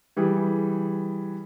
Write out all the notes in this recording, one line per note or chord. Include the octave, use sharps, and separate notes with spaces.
E3 G3 G#4